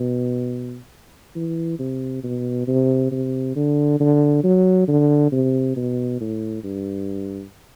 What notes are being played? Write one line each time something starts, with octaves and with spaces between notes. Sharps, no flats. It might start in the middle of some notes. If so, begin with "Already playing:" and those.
Already playing: B2
E3
C3
B2
C3
C3
D3
D3
F#3
D3
C3
B2
A2
G2